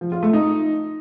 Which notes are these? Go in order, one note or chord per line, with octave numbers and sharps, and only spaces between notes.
F3
F4
A3
D#4